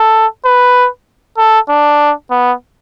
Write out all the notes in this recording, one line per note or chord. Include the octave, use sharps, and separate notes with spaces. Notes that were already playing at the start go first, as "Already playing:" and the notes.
Already playing: A4
B4
A4
D4
B3